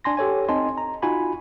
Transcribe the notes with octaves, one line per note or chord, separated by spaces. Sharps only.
D4 G#5 C6 A#6
G4 A4 C#5 G#5
C4 D#4 D#5 G#5 A5 C6
A#5
D#4 F4 F#4 G#5 B5